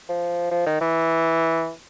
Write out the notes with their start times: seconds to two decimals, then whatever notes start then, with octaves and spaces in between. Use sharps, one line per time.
0.09 F3
0.51 F3
0.66 D#3
0.81 E3